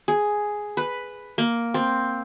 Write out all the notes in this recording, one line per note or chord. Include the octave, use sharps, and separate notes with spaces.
G#4
B4
A#3
C4